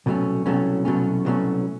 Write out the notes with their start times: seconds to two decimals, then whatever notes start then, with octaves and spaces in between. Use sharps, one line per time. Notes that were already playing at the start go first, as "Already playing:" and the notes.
0.06 C2 B2 F#3 A3 C#4
0.46 C2 B2 F#3 A3 C#4
0.85 C2 B2 F#3 A3 C#4
1.25 C2 B2 F#3 A3 C#4